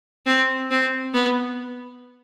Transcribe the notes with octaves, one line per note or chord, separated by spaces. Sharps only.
C4
C4
B3